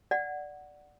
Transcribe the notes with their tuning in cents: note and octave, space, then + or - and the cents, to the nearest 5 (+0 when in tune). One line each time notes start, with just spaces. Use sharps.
D5 +0 F#5 +0